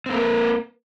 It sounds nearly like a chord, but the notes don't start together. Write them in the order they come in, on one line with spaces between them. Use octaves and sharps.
C4 A#3 A#4 B4